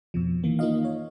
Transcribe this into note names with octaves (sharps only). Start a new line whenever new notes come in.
F2 B2 F3
D#3 E3 A#3
A#3 D#4 F4 D#5 F5
C#5